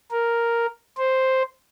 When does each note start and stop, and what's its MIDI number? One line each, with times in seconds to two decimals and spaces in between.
0.11 0.66 70
0.98 1.43 72